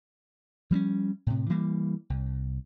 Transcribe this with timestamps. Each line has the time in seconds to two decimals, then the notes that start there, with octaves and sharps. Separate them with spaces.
0.71 F3 G3 B3 C#4
1.27 A2 C3
1.50 E3 G3 A#3
2.10 C2